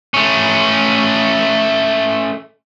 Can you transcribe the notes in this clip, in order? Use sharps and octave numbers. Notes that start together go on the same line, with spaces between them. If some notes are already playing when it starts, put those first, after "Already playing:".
A3 C#4